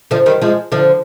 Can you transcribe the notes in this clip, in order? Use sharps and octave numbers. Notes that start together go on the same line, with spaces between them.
D3 F3
D#3 G3
F3 G#3
D3 F3